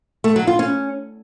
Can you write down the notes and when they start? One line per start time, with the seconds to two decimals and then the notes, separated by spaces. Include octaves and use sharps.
0.24 A3
0.36 F#3
0.47 F4
0.59 C#4